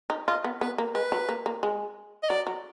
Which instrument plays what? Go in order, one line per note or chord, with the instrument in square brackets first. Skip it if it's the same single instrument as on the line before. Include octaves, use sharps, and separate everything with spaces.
[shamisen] D#4
[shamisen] F4 [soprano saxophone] D#5
[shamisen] B3
[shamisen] B3 [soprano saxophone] B4
[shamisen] A#3
[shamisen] G#3 [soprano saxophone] B4
[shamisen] F#3
A#3
A#3
G#3
[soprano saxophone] D#5
[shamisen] F#3 [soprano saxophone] D5
[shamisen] F#3